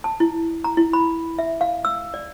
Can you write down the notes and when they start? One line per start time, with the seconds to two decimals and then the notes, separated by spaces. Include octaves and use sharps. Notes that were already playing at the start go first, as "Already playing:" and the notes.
0.04 A5
0.20 E4
0.64 A#5
0.77 E4
0.93 B5
1.39 E5
1.61 F5
1.85 E6
2.14 D5